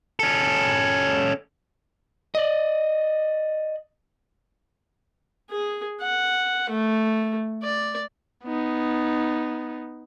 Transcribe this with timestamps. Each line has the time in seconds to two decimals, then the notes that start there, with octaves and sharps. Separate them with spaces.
0.19 C#4 A4
2.35 D5 D#5
5.50 G#4
6.01 F#5
6.70 A3
7.63 D5
8.45 B3 D#4